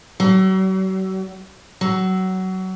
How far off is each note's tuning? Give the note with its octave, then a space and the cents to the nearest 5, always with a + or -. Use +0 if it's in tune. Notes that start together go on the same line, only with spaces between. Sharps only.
F#3 +40
F#3 +20